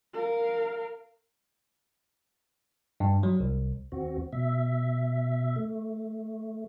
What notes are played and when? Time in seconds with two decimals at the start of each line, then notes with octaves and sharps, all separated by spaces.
0.13 A#4 F5
3.00 G2
3.23 F#3
3.40 C2
3.92 D#2 C4 F#4
4.33 B2 E5
5.56 A3